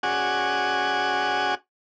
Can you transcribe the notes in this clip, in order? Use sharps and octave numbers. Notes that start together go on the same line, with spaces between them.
C#4 F#4 G#4 D5 F#5 G#5